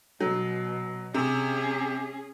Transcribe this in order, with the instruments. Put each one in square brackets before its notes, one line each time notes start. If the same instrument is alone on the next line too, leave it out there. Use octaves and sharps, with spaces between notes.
[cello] B2 [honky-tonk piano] F#3
[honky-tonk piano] C3 [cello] C#4 G#4